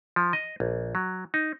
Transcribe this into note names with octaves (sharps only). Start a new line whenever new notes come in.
F3
D#5
A#1
F#3
D#4